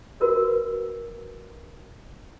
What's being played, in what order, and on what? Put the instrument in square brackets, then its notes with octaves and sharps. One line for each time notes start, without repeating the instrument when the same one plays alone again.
[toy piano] F#4 A#4 B4 C#5